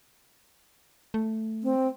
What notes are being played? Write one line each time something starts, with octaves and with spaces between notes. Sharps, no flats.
A3
C4